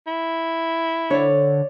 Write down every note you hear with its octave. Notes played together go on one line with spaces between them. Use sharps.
E4
D3 C#5 D5